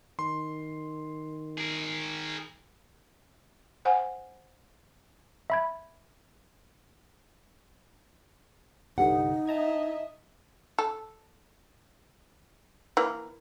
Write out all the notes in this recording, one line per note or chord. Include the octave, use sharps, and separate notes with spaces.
D#3 C6
G#4 A#4
C5 F#5 G#5
E5 B5 G#6
C2 G2 D3 D#4 F#5
D#5 E5 A5 A#5 G#6
A4
E3 A#3